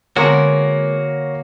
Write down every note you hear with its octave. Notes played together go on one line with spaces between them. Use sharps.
D3 G#3 A#3 B3 F#4 A#4 C#5